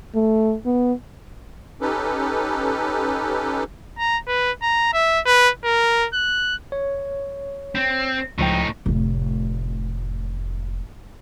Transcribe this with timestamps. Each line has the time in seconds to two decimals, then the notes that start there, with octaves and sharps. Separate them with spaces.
0.15 A3
0.66 B3
1.81 C#4 D#4 G4 A4 B4
3.98 A#5
4.28 B4
4.62 A#5
4.93 E5
5.26 B4
5.64 A#4
6.13 F#6
6.72 C#5
7.75 C4
8.39 C#2 A2 F3 D#4 G5
8.86 F1 A2